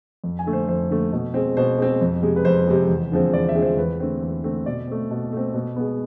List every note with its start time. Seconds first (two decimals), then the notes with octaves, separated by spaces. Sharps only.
0.24 F2
0.39 G#5
0.46 D3 A3
0.53 C5
0.68 F2 C5
0.90 D3 A3
1.13 B2
1.34 G#3 C4
1.57 B2 C5
1.78 G#3 C4
2.01 F2
2.23 C3 G#3
2.36 B4
2.45 F2 C5
2.67 C3 G#3
2.89 E2
3.12 D3 F3 G#3 C4
3.33 E2 D5
3.49 E5
3.55 D3 F3 G#3 C4
3.62 C5
3.77 E2 B4
4.00 D3 A3 C4
4.22 E2
4.43 D3 A3 C4
4.66 B2 D5
4.87 A3 C4
5.11 B2
5.32 A3 C4
5.54 B2
5.76 G#3 B3